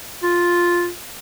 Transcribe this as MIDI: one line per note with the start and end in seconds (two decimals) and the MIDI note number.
0.23 0.88 65